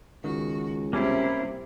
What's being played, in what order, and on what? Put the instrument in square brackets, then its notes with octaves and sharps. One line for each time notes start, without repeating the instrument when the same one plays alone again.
[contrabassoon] C#2 [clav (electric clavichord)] D#3 [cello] F#4
[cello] C3 [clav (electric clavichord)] G3 [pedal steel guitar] A#3 C#4 E4